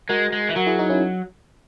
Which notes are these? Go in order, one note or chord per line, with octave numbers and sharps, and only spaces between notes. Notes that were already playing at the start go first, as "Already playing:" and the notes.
G#3 F#4 A#4
G#3
E3
F#3 F#4 A#4
E4 G#4
D#4 F#4
C#4 E4